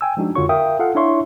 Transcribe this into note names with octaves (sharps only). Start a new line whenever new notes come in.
G5 G#5 E6
F3 G#3 D4 D#4 F#4
F2 D3 F4 F#4 C#5 C#6
A#4 E5 F5 G5 D#6
F4 A4 F5 F#5
D4 E4 C#5 E5 C6 C#6